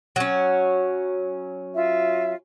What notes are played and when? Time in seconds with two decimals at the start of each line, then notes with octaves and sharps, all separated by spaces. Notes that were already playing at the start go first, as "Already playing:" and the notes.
0.16 F#3 C#4
1.74 F4 E5